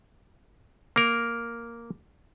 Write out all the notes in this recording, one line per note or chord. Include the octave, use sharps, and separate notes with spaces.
A#3 A#4